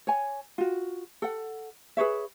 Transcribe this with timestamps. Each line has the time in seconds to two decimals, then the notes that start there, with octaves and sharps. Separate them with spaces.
0.07 C#5 G#5
0.58 F4 F#4
1.22 A4 F#5
1.97 G#4 B4 C#5 E5